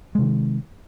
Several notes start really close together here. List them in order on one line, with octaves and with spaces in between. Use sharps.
G#3 C3 D#3